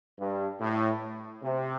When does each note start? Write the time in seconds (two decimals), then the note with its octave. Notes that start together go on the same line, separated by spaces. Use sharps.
0.18 G2
0.60 A2
1.43 C3